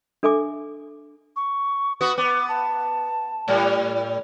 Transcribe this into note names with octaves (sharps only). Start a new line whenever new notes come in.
D4 A4 E5 G#5 D6
C#6
B3 F#4 D#6
B3 D6
A5
A2 G3